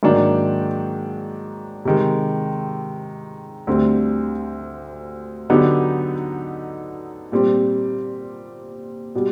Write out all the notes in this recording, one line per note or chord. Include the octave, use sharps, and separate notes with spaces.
G#2 D#3 F#3 A#3 D4
C3 D#3 G#3
D2 D3 G3 C4
D3 F#3 B3 D#4 G4
A#2 G3 C4
B2 G3